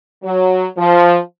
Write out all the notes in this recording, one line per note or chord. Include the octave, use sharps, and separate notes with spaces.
F#3
F3